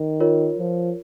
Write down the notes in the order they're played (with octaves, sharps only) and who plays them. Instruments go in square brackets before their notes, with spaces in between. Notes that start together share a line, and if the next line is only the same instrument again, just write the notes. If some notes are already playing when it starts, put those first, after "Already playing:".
Already playing: [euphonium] D#3
[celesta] F4 A#4 C#5
[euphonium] F3